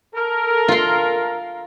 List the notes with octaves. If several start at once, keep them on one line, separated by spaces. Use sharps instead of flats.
A4 A#4
F4 C6